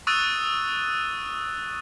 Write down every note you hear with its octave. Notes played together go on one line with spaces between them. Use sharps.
C#6 D#6 E6 F#6 A6 D#7